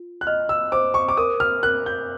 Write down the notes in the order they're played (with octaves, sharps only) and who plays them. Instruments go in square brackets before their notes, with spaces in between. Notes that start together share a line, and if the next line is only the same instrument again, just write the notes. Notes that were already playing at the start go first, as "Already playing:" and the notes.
Already playing: [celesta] F4
[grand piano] F#6
[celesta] D#5 [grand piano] F6
[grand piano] E6
[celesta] C5 [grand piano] D6
[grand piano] C#6
D6
[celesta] A#4 [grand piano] D#6
[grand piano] F6
[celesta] A#4 [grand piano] F#6
[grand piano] G6